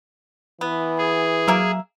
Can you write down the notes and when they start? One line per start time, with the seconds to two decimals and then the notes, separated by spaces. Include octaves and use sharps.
0.61 E3 B3
0.98 G#4
1.48 F#3 A#3 A#4 E5